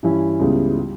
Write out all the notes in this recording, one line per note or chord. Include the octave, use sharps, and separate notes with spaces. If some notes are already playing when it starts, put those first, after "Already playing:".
G2 E3 G3 C#4 E4
C#2 C#3 G3 B3 E4
G3